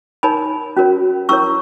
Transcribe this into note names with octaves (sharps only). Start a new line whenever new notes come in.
D#4 A#4 C#5 G#5 B5
C#4 F#4 A#4 C#5
C#4 E4 A#4 C#5 C#6 E6